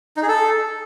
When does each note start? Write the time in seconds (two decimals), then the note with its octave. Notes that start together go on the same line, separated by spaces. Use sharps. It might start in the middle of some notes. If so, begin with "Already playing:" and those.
0.17 D#4
0.22 G#4
0.28 A4